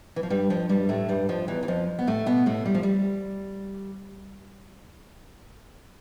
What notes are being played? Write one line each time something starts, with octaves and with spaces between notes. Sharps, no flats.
E3
F3
G2 G3
F2 F3
G2 G3
A2 A3
G2 G3
F2 F3
E2 E3
E3
F2 F3
B3
A2 A3
B2 B3
A2 A3
G3
F3
G3